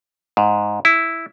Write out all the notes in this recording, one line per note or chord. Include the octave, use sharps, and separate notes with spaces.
G#2
E4